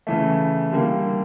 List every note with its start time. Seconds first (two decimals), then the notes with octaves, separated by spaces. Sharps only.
0.07 C#3 E3 A3
0.72 D3 G3 A#3